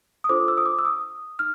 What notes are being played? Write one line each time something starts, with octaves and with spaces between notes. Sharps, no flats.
D#6
D4 F4 A4 C5 D6
E6
D#6
D6
E6
D#6
D#4 F6